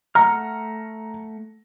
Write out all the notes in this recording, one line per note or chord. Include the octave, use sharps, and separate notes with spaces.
A3 F#5 A#5 F6